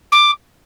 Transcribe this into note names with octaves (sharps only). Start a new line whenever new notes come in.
D6